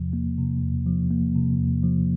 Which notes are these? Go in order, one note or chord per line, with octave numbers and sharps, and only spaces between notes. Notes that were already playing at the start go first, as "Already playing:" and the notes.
Already playing: E2 C3 F3
A#3
C3
E2
F3
A#3
C3
E2
F3